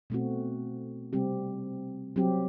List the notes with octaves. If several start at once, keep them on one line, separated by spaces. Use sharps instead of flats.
B2 A3 C4 F#4
C3 G3 C4 G4
F#3 C4 G4